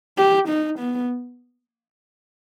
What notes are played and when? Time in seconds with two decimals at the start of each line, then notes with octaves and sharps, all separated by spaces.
0.18 G4
0.49 D#4
0.79 B3